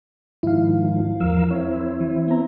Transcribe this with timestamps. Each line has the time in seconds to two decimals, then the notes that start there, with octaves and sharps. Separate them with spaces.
0.43 G#2 D#3 F3 E4 F5
1.20 E2 F3 A#4 F5 E6
1.51 C4 E4 C#5
2.00 E3
2.28 B3 A#5